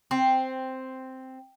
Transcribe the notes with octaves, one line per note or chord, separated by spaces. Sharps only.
C4